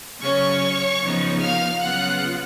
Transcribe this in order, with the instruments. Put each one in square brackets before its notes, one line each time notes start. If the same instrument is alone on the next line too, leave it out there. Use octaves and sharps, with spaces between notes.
[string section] C#3 F#3 C#4 C#5 C#6
C#3 F3 B3 D#4
F5 F6
C#3 F#3 B3 F4 F#5 F#6